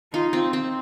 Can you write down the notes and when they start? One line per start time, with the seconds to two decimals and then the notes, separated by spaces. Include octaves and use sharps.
0.13 D#4 F4
0.33 C4
0.53 C4